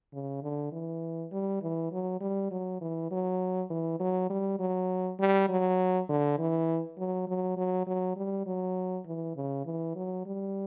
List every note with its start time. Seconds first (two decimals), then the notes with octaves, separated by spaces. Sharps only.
0.13 C#3
0.43 D3
0.72 E3
1.32 G3
1.62 E3
1.92 F#3
2.21 G3
2.51 F#3
2.81 E3
3.11 F#3
3.70 E3
4.00 F#3
4.30 G3
4.60 F#3
5.19 G3
5.49 F#3
6.09 D3
6.38 E3
6.97 F#3
7.28 F#3
7.57 F#3
7.87 F#3
8.17 G3
8.46 F#3
9.06 E3
9.36 C#3
9.65 E3
9.96 F#3
10.26 G3